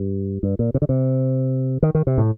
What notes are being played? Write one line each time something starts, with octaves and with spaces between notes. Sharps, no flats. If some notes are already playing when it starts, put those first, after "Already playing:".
Already playing: G2
G2
A#2
C3
D3
C3
D#3
D#3
C3
A2